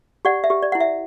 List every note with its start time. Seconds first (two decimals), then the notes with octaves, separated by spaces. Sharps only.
0.25 G4 D5 F#5
0.44 E5
0.50 G4
0.62 D5
0.72 E4 F#5
0.80 E5